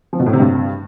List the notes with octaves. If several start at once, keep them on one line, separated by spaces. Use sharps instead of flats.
F3
B2
A2
C3
G2